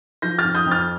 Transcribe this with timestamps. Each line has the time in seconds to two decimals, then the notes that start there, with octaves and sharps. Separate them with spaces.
0.22 F3 G6 A#6
0.39 F6 A6
0.44 F2
0.55 D#6 G6
0.66 F2
0.71 F6 A6